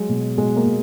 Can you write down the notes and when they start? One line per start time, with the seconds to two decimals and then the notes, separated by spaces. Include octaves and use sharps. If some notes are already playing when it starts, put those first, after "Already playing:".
Already playing: F#3 G#3
0.09 B2
0.38 B2 G#3
0.56 A#3
0.66 B2